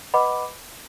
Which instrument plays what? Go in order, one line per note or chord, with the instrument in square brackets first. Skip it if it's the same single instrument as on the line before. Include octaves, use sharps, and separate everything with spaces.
[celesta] B4 D#5 F#5 B5 D6